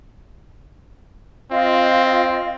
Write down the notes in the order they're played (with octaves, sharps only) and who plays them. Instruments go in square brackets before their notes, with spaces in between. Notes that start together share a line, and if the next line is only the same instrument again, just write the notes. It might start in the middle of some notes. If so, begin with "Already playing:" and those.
[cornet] C4 [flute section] F4 D#5